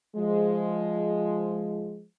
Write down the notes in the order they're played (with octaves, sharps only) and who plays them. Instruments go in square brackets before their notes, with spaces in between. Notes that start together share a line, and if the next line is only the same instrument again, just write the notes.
[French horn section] F3 G#3